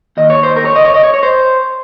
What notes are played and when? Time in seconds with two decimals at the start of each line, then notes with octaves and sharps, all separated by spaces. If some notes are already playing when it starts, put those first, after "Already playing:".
0.17 D#2 D#3 D#5
0.30 C#5
0.43 C5
0.56 A#4
0.65 C#5
0.76 D#5
0.85 C#5
0.94 D#5
1.03 C#5
1.14 C#5
1.23 C5